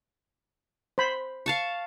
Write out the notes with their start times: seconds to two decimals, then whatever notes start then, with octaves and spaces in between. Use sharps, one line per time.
0.98 C5 B5
1.46 F5 A5 C#6